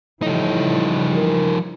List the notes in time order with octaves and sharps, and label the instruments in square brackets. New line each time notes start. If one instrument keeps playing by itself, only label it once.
[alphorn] A2 [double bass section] C#3 E3 G3 [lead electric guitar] F3 D#4
[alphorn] A#4